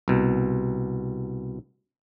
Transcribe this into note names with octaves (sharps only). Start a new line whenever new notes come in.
C2 B2